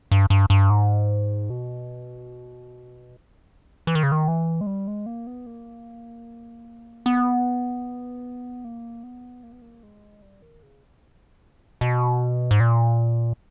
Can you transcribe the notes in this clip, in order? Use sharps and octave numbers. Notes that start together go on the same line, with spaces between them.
G2
G2
G2
G#2
B2
E3
D#3
C#3
D#3
E3
G#3
G3
G#3
A#3
B3
A#3
B3
A#3
B3
A#3
B3
A#3
G#3
G3
D#3
C#3
B2
G#2
A#2